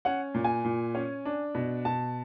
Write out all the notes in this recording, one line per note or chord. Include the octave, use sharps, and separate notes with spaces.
C#4 F#5
A#2
G#5
A#2
C#4
D4
B2
B2 A5